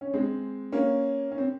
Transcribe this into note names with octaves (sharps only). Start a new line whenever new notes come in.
C#4
G#3 C4
A#3 C#4
C#4
C4